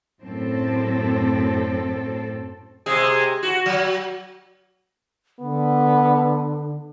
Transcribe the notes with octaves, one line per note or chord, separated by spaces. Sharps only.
F#2 A2 C4 A4
C3 G#3 G#4
F#4
F#3
D3 B3